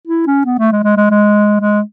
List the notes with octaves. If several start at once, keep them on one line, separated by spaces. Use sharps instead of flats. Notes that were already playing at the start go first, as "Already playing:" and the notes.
E4
C#4
B3
A3
G#3
G#3
G#3
G#3
G#3